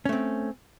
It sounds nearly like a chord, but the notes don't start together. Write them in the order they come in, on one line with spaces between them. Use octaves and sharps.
C#4 A3 C4